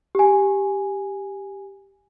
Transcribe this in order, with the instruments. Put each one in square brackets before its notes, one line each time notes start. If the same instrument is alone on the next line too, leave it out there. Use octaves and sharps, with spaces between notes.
[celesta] G4 G#5